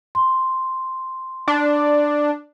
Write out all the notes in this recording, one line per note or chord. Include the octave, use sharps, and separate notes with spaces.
C6
D4